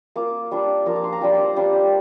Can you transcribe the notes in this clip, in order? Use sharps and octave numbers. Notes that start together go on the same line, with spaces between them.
A#3 F4 D6
G3 D4 F4
F3 A#3 F4 A#5
D6
C6
A#5
G3 D4 F4 G5
D5
C5
G3 D4 F4 D5
G5